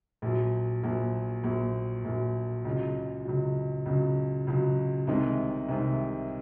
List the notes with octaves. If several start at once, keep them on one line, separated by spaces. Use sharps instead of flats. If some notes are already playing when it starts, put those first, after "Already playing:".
A#1 A#2 F#3
A#1 A#2 F#3
A#1 A#2 F#3
A#1 A#2 F#3
C#2 C#3 F#3
C#2 C#3 F#3
C#2 C#3 F#3
C#2 C#3 F#3
C2 C3 D#3 G#3
C2 C3 D#3 G#3